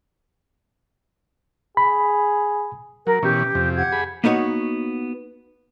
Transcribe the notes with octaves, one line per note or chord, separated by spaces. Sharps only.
G#4 B5
F#3 A#4
B2 E3 C#4 G4
F2 C3
G4 F#5 G#6
G#4 B5
A#3 B3 D#4 F#4 C#5